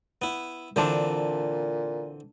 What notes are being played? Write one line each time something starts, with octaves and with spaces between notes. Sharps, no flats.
B3 E4
A#2 D3 E3 C4 D4 C5